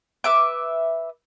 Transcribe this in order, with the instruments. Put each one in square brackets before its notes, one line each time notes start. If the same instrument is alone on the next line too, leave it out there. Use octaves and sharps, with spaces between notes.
[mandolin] B4 E5 D6